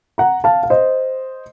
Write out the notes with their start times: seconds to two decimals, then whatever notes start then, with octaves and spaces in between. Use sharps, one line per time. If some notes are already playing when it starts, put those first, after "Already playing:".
0.18 F#5 A#5
0.44 F5 A5
0.63 F5
0.70 C5 D#5